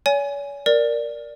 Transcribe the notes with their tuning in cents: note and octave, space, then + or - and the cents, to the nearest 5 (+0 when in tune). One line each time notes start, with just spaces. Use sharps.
C#5 +40 G#5 +0
A#4 +0 D5 +0